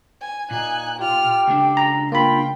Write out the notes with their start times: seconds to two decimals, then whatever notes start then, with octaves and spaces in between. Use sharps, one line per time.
0.21 G#5
0.51 A#2 D#4 G#5 F#6
0.99 F4 G4 F6
1.48 C#2 D4 A4
1.77 A#5
2.12 A#3 F4 G5 B5